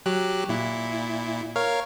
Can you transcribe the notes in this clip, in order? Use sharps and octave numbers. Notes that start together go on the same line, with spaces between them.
F#3 G4 F#6
A#2 E4
A#4 C#5 F5